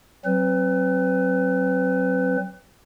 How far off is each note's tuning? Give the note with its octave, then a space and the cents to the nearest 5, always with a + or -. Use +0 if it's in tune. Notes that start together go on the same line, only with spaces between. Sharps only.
F#3 +15 C4 +25 B4 +30